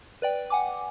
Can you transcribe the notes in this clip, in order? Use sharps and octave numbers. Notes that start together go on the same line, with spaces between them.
B4 D5 G5
F#5 G#5 D6